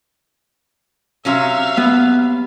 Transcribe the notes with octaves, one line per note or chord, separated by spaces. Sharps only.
C3 F#3 C#4 E5 F5
B3